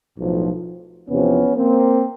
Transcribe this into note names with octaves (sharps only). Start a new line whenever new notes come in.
B1 A2 F3
E2 C3 F3 B3 C#4
A#3 C4